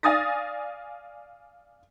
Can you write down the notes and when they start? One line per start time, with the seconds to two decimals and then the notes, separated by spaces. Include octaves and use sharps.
0.03 D5 F5 G#5 D#6 A6 A#6